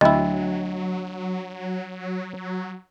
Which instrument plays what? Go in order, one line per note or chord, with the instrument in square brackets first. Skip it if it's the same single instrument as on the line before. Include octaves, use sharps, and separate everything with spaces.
[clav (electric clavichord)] D2 E4 [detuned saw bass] F#3 [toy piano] D4 D#5